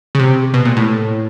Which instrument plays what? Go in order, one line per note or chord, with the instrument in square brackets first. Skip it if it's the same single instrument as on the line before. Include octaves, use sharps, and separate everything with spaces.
[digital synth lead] C#3
C3
B2
A#2
A2